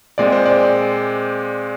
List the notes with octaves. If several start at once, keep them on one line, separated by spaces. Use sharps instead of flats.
A#2 G#3 C4 D5
C5
D5